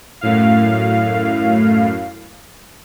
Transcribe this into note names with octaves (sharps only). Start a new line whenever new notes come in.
F#2 A2 F5